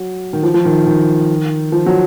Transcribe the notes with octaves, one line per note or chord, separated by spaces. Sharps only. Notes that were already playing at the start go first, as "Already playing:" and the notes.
Already playing: F#3
D#3
F3
F3
D#3
D#3
F3
F#3